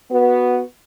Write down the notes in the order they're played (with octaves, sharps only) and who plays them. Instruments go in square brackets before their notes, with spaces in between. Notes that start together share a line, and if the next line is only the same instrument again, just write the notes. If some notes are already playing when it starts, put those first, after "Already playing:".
[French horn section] B3 F#4